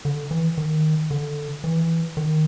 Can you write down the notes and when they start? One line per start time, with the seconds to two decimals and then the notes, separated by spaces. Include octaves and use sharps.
0.05 D3
0.31 E3
0.58 D#3
1.11 D3
1.64 E3
2.17 D#3